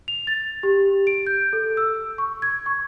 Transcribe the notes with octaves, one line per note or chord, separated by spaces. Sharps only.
F7
A6
G4
D7
G6
A4
E6
C#6
G#6
C#6